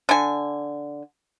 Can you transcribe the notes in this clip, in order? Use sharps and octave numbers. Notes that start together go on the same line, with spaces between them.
D3 G#5